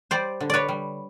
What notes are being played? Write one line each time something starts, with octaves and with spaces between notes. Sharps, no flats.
G3 C5 D5
D3
B4 C#5 D5
G3